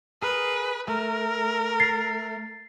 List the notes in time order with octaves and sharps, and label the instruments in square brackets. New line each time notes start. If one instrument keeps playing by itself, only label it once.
[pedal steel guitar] G#4 A#4 [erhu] B4
[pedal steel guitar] A3 [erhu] A#4
[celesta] A6 C7